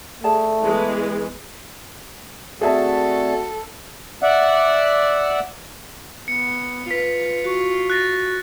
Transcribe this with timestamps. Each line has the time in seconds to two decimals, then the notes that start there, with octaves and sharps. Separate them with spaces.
0.24 A3 G#4 D5 A5
0.63 E3 G#3 B3
2.61 A3 C4 F#4 G#4 A4 D5 E5 A5
4.23 D5 E5 F#5
6.28 B3 C#7
6.91 F4 B4 B6
7.44 F#4 C#6
7.90 F#6 A6 A#6